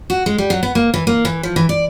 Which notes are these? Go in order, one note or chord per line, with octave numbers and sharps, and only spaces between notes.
F#4
G#3
G3
F#3
B3
A#3
E3
A#3
E3
F3
E3
D5